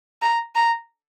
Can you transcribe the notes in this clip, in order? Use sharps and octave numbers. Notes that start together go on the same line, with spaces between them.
A#5
A#5